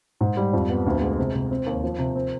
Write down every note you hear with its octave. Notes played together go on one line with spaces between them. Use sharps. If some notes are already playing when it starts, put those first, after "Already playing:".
G#2
G3
F2
B3
D2
G#3
C3
C3
C4
D#2
F3
C3
C4